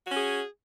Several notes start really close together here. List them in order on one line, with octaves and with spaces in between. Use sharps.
F#4 C#4 G#4